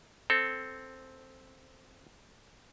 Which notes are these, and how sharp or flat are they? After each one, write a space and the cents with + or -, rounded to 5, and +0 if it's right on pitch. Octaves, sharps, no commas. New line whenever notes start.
C4 +0 A4 +0